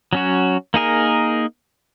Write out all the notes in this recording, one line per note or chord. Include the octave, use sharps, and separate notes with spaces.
F#3 C#4 F#4
A#3 D#4 G#4 A#4